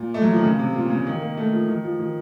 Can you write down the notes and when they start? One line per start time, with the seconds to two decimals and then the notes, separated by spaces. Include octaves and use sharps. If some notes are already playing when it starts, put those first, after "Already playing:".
Already playing: A#2
0.14 A3
0.22 F#3
0.30 F3
0.36 D#3
0.44 C#3
0.59 C3
0.75 A#2
0.90 C#3
1.07 D#3
1.22 A#3
1.37 A3
1.52 F3
1.69 D#3
1.84 F3
1.99 D#3